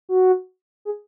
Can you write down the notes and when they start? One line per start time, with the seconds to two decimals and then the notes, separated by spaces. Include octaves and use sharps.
0.09 F#4
0.85 G#4